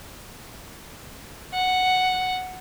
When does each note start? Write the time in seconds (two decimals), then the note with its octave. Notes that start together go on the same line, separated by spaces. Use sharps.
1.53 F#5